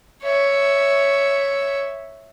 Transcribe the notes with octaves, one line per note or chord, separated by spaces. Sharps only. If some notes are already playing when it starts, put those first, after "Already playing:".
C#5 E5